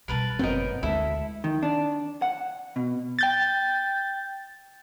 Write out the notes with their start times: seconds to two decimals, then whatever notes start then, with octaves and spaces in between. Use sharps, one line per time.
0.08 B2 G3 A#4 B4 A5
0.39 G1 B3 C4 A#4 C#5 D#5 G5
0.83 D2 G#3 E4 A4 E5
1.44 D#3
1.63 D4
2.22 F#5
2.76 B2
3.19 G5 G6 A6